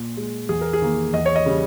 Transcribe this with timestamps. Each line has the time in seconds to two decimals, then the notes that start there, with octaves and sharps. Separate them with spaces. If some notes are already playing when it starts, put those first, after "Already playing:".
Already playing: A#2
0.17 G#3
0.49 E2 G#4
0.61 A#4
0.73 G#4
0.82 D#3 A#3
1.13 E2 D#5
1.26 C#5
1.36 D#5
1.46 C#3 G3